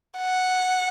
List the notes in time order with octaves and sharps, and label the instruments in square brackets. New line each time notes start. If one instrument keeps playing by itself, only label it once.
[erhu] F#5